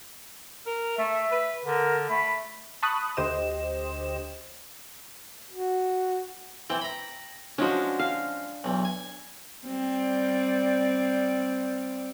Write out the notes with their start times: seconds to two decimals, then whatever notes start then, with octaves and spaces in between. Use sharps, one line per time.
0.67 A#4
0.98 A3 E5
1.32 B4
1.65 D3 A#4
2.09 A3 B5
2.83 A5 B5 C#6 D#6 F#6
3.17 D2 G4 C5 D#5 E7
5.50 F#4
6.70 E3 C4 G5
6.81 A#5 B5
7.58 F3 G#3 C#4 D4 F#4
7.99 F5
8.64 B1 E2
8.85 G#5
9.67 G3 C4 D5